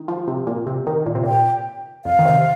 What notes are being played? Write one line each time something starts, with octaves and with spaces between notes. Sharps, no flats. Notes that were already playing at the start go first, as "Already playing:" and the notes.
Already playing: D#3
F3
C3
A#2
C3
D#3
A#2
C3
A#2 G5
F2 F5
D#3
C3